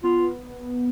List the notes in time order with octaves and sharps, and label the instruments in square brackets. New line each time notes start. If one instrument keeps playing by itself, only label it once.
[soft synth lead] B3 [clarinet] F4